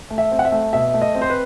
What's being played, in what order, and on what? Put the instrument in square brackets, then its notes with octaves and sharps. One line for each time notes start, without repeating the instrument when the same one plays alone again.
[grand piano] A3
E5
C4
F#5
E5
A3
B2 E5
A3
D#5
C4
C5
B4